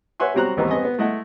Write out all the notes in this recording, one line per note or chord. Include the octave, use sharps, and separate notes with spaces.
B4 C#5 E5 F#5 G#5 C6
F#3 G3 C4 F#4 A#5 F#6
G#1 D#2 E3 B3 C4 A#5
B3 C4 D#5 G#5
B3
G#3 A3 E4 D#5 F#5